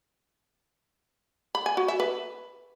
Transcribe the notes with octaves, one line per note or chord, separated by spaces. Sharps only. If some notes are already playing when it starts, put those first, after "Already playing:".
B5
G#5
F#4
E5
B4